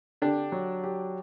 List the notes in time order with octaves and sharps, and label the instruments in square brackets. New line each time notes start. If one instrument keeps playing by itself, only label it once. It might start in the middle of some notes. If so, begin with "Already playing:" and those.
[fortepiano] D3 D4 [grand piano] G4
[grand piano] F#3
G4